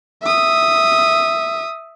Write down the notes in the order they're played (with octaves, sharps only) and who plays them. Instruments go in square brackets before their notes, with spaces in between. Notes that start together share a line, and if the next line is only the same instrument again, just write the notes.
[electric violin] E5 D#6